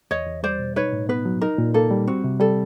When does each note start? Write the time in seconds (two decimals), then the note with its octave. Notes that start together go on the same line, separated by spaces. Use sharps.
0.11 E2 C#5 D#5
0.27 E2
0.43 G3 C5 D5
0.59 B2
0.76 D#4 B4 C#5
0.92 A2
1.09 B3 B4
1.25 F#3
1.41 D#4 A#4
1.58 A#2
1.74 A#3 A4
1.91 G3
2.07 C4 F#4
2.24 C3
2.40 G3 A4